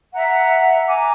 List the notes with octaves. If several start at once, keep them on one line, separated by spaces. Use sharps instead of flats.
E5 F#5 A#5
G#5 A#5 D6